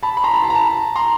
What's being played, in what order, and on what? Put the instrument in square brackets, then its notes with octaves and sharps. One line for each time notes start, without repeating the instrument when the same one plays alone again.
[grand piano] A5 B5
B5
A#5 C6
A5 B5
A5 B5
A#5
A5 B5
A#5 C6